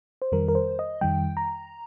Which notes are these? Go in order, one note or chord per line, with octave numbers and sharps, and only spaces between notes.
C5
F2 D#3 G3 A#4
A#4
C5
D#5
F2 D#3 G3 G5
A#5